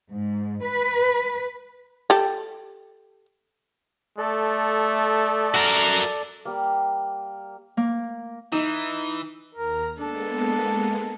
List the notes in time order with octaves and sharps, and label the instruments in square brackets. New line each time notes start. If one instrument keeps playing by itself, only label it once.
[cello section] G#2
B4
[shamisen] G4 A4
[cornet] A3 [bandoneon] A4 D5
[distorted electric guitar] F#4 A#4
[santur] G3 A#3
[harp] A#3
[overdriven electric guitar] E3 [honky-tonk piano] D#4
[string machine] D#2 A#5 [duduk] A#4
[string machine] G#3 A#3 B3 [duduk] D4 [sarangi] A4